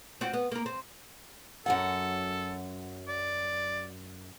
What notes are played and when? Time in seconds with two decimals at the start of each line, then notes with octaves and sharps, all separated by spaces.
0.21 C4 F4 F#4
0.33 B3
0.52 A#3 A#4
0.66 C4
1.66 F#2 F#3 A4 F#5
3.08 D5